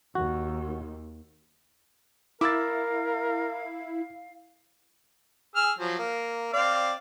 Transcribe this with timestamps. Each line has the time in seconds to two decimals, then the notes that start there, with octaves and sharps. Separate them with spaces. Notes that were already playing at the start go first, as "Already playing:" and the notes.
0.15 D#2 F#4
2.41 E4 A#4 F5 D6 E6 A6
5.56 G#4 E6 F6
5.79 F3 F#3
5.98 A#3
6.53 C4 D5 F5